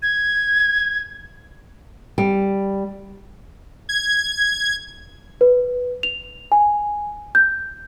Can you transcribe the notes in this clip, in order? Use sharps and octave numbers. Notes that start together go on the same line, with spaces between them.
G#6
G3
G#6
B4
F7
G#5
G6